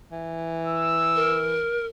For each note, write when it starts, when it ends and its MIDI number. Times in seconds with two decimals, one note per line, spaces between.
0.12 1.66 52
0.67 1.43 88
1.16 1.86 70